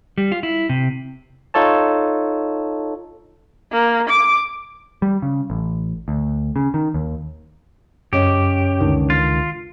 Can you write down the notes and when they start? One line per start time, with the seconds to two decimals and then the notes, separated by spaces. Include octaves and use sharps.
0.18 G3
0.32 F4
0.43 E4
0.69 C3
1.54 D#4 F4 A4 C#5 A5
3.72 A#3
4.09 D6
5.02 G3
5.22 C#3
5.50 A1
6.08 D2
6.56 C#3
6.74 D#3
6.94 D#2
8.13 F#2 C#3 C#4 G4 D#5
8.81 C#2 D3 D#3
9.10 F4 A6